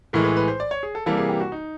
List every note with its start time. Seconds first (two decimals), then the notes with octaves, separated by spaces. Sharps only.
0.13 A2 E3 G#3 A#4
0.25 B4
0.37 B4
0.48 C5
0.60 D5
0.71 C#5
0.83 G#4
0.95 A4
1.06 C3 E3 G3 A#3 A4
1.17 G#4
1.29 G4
1.40 F#4
1.52 D#4